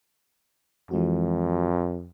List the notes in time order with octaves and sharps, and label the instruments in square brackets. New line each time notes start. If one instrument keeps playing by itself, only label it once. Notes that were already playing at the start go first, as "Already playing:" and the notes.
[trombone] F2 [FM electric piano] E3 G#3 F#4